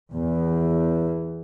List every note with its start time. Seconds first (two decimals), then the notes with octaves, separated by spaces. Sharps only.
0.12 E2